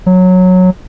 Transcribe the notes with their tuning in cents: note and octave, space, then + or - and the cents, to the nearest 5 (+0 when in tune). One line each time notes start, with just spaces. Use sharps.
F#3 -10